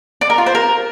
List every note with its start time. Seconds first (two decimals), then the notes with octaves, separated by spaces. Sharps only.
0.21 D5
0.30 A#4
0.38 F4
0.46 C5
0.55 A#4